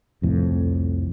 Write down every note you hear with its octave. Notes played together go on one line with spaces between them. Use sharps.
C2 F2 A2